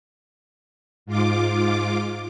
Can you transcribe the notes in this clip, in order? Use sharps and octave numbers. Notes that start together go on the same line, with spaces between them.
G#2 F4 D6